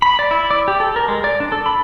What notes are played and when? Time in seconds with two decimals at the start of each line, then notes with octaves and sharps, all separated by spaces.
0.02 B5
0.19 D5
0.31 E4
0.51 D5
0.68 G4
0.80 A4
0.96 A#4
1.08 G#3
1.24 D5
1.40 D4
1.52 A4
1.66 B5